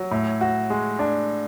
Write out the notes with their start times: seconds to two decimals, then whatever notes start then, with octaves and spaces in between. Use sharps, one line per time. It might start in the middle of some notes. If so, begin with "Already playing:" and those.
Already playing: F#3
0.11 A2
0.41 F#4
0.70 G#3
0.99 D4